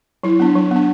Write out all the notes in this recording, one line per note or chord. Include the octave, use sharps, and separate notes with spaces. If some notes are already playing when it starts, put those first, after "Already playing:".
F#3 E4
B3 D4
F#3
B3 D4